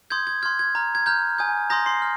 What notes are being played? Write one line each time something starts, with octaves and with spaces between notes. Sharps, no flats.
C6 D#6 G6 G#6
G#6
C6 F6 G#6
G#6
A#5 F6
G#6
A#5 F6 G6
G#5 D#6 G6
A#5 C6 D#6 G6 A#6
C6 C7
F6